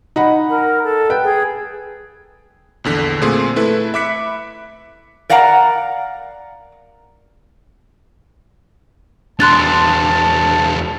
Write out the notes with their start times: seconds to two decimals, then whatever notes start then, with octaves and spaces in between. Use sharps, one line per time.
0.16 D#4 F#5 B5
0.50 A#4
0.84 A4
1.10 B4 G5
1.24 G#4
2.84 A#1 E2 D3 B6
3.22 A#2 A3 C4 G#4 C6
3.56 A3 E4 A4 B4
3.94 E5 B5 D6 F#6 B6 C#7
5.30 A#4 D5 F5 F#5 A5 A#5
9.40 E2 D4 A5 C6 F#6 A6